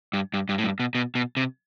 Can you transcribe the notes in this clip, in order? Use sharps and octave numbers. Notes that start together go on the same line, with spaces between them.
G2
G2
G2
A2
G2
B2
B2
B2
C3